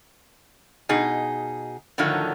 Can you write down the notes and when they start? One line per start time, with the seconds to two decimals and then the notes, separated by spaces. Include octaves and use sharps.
0.89 B2 D#4 G#4
1.98 A2 D3 D#3 F3 F#3